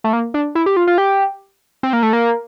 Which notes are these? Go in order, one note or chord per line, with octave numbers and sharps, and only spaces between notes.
A3
A#3
D4
E4
G4
F4
F4
G4
C4
A#3
A3
A#3